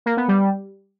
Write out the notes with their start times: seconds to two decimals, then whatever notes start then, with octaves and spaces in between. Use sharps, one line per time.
0.06 A#3
0.17 B3
0.28 G3